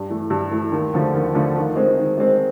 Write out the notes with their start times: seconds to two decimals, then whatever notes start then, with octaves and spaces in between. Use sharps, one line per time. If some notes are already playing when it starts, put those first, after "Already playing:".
Already playing: G2
0.10 E3 A3
0.30 G2
0.51 E3 A3
0.72 D#2
0.94 D3 F3 A3
1.14 D#2
1.35 D3 F3 A3
1.56 D#3
1.76 G#3 C4
1.98 D#3
2.18 G#3 C4